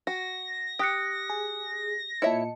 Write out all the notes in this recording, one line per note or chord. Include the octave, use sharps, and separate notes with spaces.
F#4 A#6
G4 D#6 F#6 C#7
G#4
A#2 E4 C#5 D#5 E5 A5 C#7